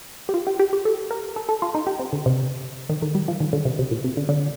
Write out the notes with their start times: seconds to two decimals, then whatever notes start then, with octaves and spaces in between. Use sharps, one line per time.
0.29 G4
0.34 F4
0.47 G4
0.59 G4
0.73 G4
0.85 A4
1.11 A#4
1.36 A4
1.49 A4
1.62 F4
1.75 D#4
1.87 G4
1.99 C4
2.13 D3
2.26 C3
2.89 D#3
3.02 D#3
3.15 G3
3.28 F3
3.40 D#3
3.53 D3
3.65 C3
3.79 C3
3.91 A#2
4.04 C3
4.17 D3
4.29 D3